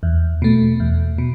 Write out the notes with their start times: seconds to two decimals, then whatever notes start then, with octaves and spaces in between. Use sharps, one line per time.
0.03 E2
0.42 B2 A3
0.80 E2
1.18 B2